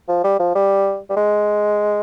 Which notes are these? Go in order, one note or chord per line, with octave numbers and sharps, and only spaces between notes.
F3
G3
F3
G3
G3
G#3